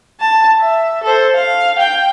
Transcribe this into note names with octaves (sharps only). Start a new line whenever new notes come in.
A5
E5
A4 C5
F5
G5